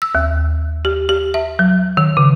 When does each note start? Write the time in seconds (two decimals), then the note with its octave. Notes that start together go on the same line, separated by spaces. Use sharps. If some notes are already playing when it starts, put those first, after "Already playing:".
0.02 E6
0.15 D#2
0.85 G4
1.09 G4
1.34 E5
1.59 F#3
1.97 D#3
2.17 C#3